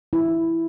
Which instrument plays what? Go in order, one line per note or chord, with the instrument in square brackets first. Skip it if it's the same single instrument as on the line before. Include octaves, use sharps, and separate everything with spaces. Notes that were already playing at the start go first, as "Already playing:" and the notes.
[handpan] E4